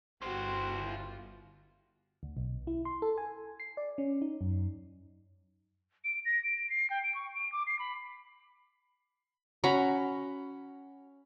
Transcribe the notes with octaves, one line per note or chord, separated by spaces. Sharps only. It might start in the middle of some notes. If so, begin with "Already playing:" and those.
G1 E4 F#4 G4 C5
F4
D2
B1
E4
C6
A4
G#5
C7
D5
C#4
D#4
F#2
D7
A#6
D7
C7
G5
D7
C#6
D7
D6
C7
B5
C#4 F#4 A#5 B5